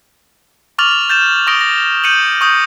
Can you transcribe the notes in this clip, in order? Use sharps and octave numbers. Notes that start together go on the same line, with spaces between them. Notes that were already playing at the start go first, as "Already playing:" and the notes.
C#6 D6 F6 A6 F7 F#7
G6 A6 E7
C#6 D#6 A#6 D7 G7
A#6
G6 C#7 D#7 F#7
C#6 D#6 G6 F#7